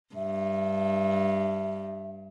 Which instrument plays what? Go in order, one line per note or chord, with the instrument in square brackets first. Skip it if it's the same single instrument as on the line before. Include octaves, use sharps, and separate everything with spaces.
[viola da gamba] G2 [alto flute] E5